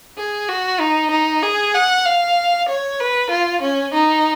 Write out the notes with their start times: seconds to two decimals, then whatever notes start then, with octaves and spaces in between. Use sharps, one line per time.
0.18 G#4
0.49 F#4
0.80 D#4
1.11 D#4
1.43 G#4
1.74 F#5
2.06 F5
2.69 C#5
3.00 B4
3.31 F4
3.62 C#4
3.94 D#4